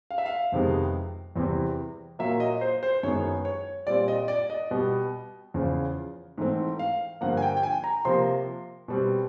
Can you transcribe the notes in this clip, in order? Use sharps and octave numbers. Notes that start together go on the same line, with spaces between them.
F5
E5
F5
F2 C3 D#3 G#3 B3
E2 C3 E3 G3 C4
A#2 F#3 A#3 E5
D#5
C5
C5
F#2 D#3 G#3 B3 C#5
C#5
A#2 G3 C4 D5
D#5
D5
D#5
B2 G3 B3
E2 C#3 F3
G#2 E3 A3 C4
F5
G2 D3 F3 A#3 F#5
G#5
G5
G5
G#5
A#5
C3 F3 A#3 C6
B2 G3 C4